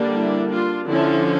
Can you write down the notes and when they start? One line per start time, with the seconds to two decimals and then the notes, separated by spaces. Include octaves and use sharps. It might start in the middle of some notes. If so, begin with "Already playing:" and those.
Already playing: D3 G3 A#3 D4
0.14 E4
0.50 D4 F4
0.88 D3 F3 C#4 E4